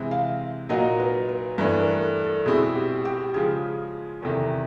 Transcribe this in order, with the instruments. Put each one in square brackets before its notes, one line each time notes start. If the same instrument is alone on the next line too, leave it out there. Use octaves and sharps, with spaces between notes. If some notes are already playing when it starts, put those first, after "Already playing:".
Already playing: [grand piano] C3 E3 G#3 C4
[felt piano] F5
[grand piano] A#2 F#3 A#3 D#4 F#4 [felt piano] D#5
[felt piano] B4
B4
[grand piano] G2 E3 A3 D4 [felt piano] B4
[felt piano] A#4
A4
A4
[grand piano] B2 G#3 C4 E4 [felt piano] G#4
[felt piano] G4
G4
[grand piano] C#3 F3 G#3 [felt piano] G#4
[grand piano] E2 C3 D#3 [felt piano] A4